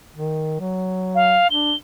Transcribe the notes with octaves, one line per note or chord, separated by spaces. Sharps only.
D#3
F#3
F5
D4 G7